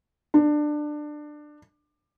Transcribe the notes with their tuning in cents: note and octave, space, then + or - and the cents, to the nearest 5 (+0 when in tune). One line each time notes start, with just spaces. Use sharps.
D4 +20